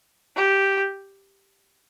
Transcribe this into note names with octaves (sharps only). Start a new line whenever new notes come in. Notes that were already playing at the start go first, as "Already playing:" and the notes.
G4